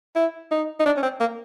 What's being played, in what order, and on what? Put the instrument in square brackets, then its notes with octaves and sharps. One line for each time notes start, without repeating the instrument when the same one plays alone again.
[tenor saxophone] E4
D#4
D#4
D4
C#4
C4
A#3